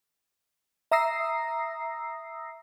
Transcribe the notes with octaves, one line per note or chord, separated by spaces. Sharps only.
E5 A#5 D#6 E6 A#6 C7